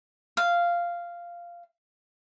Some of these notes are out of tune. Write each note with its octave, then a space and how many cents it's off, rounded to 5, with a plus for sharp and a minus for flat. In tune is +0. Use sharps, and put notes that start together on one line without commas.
F5 -10